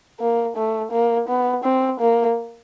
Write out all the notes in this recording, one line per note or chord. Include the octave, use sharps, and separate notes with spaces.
A#3
A3
A#3
B3
C4
A#3